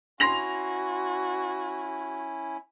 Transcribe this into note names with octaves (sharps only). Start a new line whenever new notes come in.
C#4 E4 F#4 C6 A#6 F7